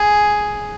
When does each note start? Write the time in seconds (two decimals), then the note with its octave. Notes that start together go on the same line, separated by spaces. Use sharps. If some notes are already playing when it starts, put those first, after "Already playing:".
Already playing: G#4